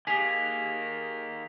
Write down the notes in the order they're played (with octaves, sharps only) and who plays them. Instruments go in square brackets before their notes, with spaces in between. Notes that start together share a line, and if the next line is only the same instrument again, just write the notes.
[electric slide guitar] D#3 A#3 [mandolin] G4 G#4 [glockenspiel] B6 F7